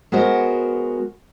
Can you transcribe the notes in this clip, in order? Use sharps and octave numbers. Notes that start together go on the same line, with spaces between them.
G#3 B3 F#4 A#4 C5